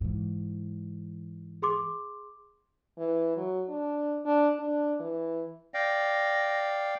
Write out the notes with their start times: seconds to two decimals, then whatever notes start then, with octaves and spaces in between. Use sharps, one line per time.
0.01 G#2 E3
1.62 G#4 C6 D6
2.98 E3
3.37 F#3
3.69 D4
4.25 D4
4.60 D4
5.00 E3
5.74 D5 F5 G5 A#6